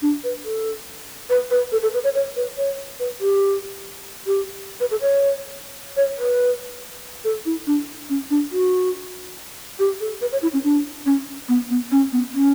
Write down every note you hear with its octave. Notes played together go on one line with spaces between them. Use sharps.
D4
B4
A4
B4
B4
A4
A4
B4
C#5
C#5
B4
C#5
B4
G4
G4
B4
A4
C#5
C#5
B4
A4
E4
D4
C#4
D4
F#4
G4
A4
B4
C#5
E4
C#4
D4
C#4
B3
B3
C#4
B3
C#4